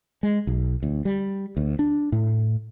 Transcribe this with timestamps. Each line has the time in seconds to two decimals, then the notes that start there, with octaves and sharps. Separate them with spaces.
0.23 G#3
0.47 B1
0.83 D2
1.05 G3
1.57 D2
1.79 D4
2.12 A2